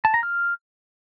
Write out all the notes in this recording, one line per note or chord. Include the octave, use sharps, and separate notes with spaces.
A5
A#5
F6